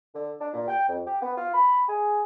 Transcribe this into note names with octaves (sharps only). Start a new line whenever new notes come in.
D3
D4
A#2
G5
F2
G4
B3
F4
B5
G#4